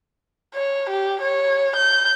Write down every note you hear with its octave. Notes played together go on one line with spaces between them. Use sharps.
C#5
G4
C#5
G6